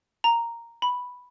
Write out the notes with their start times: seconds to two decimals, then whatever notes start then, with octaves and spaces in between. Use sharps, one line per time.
0.24 A#5
0.82 B5